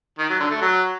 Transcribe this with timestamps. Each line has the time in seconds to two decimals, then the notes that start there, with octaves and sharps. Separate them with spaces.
0.19 D#3
0.29 F#3
0.40 D3
0.51 A3
0.61 F#3